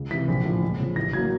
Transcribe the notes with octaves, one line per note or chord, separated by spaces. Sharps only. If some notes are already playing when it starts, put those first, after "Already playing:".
Already playing: C#2
C3 E3 B6
A#1
A2 F3
C#2
C#3 F3
A1 A#6
A2 F#3 A#3 G#6